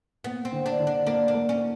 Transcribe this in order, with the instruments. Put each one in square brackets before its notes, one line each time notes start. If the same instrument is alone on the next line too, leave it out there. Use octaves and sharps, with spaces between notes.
[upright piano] A#3 [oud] B3
[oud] C4
[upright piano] D3
[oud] D4
[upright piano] D3
[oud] D4
[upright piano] A#3 [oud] D4
[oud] D4
[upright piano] A#3
[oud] C#4